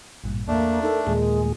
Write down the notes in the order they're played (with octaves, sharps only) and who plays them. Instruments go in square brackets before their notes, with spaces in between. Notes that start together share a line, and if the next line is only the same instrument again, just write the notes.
[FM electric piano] A1 G2 A#2
[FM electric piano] E2 [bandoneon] A3 D4 [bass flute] A#3
[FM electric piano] D#4 A#4 [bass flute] A4
[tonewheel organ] D#2 A#2 G#4 [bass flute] G#3